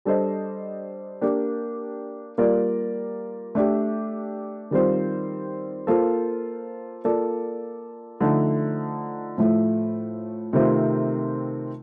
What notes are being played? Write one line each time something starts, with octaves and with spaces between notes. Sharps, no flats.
G3 D4 A4 C5 D#5
A#3 D4 G4
G3 A#3 F4 A#4 D5
A3 D4 G4
D#3 G3 C4 F4 C5
A#3 F4 A4 C5
A#3 F4 A4 D5
D3 F3 A3 D#4 A4
A2 F3 A3
C3 D#3 A3 C4 F4